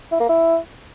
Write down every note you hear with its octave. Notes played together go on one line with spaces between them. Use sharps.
E4
A#3
E4